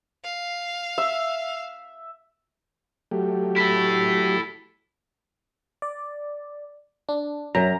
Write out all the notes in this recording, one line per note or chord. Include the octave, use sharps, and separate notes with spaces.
F5
E5
F#3 A3 G4
E4 A4
D5
D4
F#2 A#5